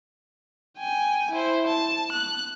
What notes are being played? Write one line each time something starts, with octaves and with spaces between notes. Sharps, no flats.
G5 G#5
E4 C5
A5
F#6